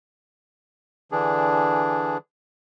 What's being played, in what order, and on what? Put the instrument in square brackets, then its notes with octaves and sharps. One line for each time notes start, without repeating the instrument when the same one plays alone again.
[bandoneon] D3 E3 D4 G#4